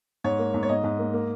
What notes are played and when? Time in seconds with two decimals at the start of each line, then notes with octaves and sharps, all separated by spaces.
0.24 G#2 C#5
0.39 A#3
0.54 G#2
0.63 C#5
0.69 G#2 D#5
0.84 G#2
0.99 A#3
1.13 A#3